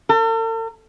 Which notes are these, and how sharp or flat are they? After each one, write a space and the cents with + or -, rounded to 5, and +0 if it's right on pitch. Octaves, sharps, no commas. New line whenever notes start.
A4 +45